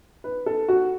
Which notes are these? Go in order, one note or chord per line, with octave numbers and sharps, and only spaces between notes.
B4
A4
F#4